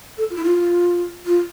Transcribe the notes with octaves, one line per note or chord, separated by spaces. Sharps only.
A4
F4
E4
F4
F4